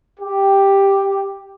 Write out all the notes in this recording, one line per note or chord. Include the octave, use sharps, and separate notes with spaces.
G4